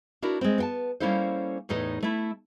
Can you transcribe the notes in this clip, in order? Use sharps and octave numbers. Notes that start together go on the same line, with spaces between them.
D4 E4 F#4 A#4
G#3 C4
B3 G5 A5
G3 A#3 C#4 E4 A4 C5
E2 A2 D#4 A4
A3 E4